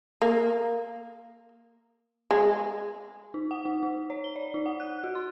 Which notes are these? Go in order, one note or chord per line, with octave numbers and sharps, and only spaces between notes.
A#3
G#3
D#4
F#5
D#4
D#4
C#5
G7
D5
D#4
F#5
F#6
F#4
C6